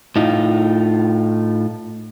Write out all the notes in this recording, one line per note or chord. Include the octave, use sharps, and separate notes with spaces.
A2 D#4 F4